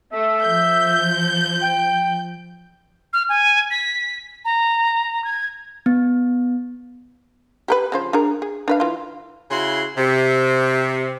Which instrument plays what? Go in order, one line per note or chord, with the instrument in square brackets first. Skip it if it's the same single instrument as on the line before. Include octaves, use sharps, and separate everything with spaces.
[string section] A3 [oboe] E5
[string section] F3 G6
[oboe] G5
[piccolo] F6
G#5
B6
A#5
G#6
[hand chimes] B3
[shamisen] G4 A#4 B4
C#3 F3 C5
D4 G#4 A#4
G#4
D4 B4 F5
E3 F4
[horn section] C#3 E4 F#4 C6
C3